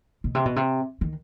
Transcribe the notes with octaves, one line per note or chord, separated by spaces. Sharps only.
B2
C3
B2
C3
D#3